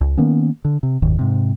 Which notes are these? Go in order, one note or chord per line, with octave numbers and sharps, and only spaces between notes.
C#2
D#3 A#3 B3 C#4
D3
C3
F#1 D#2 G#2 D#3
G#2 C3